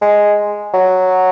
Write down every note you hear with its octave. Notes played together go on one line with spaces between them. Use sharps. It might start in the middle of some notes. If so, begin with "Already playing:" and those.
G#3
F#3